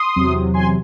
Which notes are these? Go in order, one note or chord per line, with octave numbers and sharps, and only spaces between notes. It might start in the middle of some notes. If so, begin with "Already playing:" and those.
Already playing: C6 D#6
E2 C3 F#3
G#5 C6